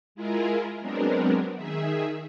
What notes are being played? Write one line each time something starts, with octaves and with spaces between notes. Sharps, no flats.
G#3 E4 F4 G#4 A#4
F#3 G#3 B3 C4 D4 A#4
D#3 G#4 E5